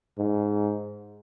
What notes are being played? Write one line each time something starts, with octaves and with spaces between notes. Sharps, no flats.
G#2